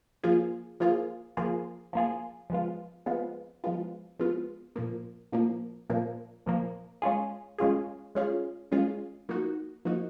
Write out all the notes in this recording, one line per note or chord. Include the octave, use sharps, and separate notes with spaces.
F3 A#3 F4 G#4
F3 A#3 F4 G#4
F3 A#3 F4 G#4
F3 A#3 F4 G#4
F3 G#3 B3 F4
F3 G#3 B3 F4
F3 G#3 B3 F4
F3 G#3 B3 F4
A#2 F3 A#3
A#2 F3 A#3
A#2 F3 A#3
A#2 F3 A#3
G#3 C#4 F4 G#4
G#3 C#4 F4 G#4
G#3 C#4 F4 G#4
G#3 C#4 F4 G#4
F3 A#3 D#4 F#4
F3 A#3 D#4 F#4